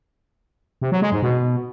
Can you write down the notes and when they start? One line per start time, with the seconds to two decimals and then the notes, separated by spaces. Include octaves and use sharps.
0.82 C3
0.92 F#3
1.02 G#3
1.12 G#2
1.22 B2